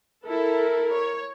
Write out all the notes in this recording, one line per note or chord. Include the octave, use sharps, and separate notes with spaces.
E4 A4 A#4
C#5